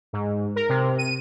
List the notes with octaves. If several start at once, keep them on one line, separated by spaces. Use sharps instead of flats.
G#2
A#4
C3
D#7